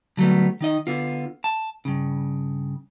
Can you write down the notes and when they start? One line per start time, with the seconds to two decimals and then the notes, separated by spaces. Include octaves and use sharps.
0.17 D3 F#3 G3 A3 B3
0.61 D#3 D#4 D#5
0.87 D3 B3 F4
1.44 A5
1.85 G2 C#3